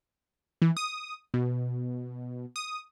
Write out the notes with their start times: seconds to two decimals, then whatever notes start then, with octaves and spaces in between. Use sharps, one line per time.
0.62 E3
0.77 D#6
1.34 B2
2.56 D#6